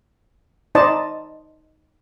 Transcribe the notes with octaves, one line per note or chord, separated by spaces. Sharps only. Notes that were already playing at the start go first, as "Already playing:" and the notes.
D#4 C5 D5 D#5 A5